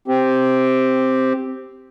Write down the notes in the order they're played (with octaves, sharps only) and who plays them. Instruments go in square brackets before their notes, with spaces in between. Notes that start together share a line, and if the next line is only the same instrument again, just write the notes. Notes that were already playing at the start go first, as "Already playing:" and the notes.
[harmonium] C4 G4